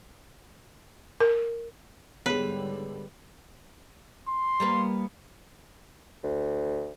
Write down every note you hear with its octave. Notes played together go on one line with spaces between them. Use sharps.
A#4
G#2 D3 G3 B3 G#4 B4 C#5
C6
G3 A#3 B3
D2